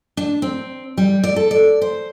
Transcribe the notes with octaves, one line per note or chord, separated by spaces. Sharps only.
D4
C4
G3
D5
A4
D5
C5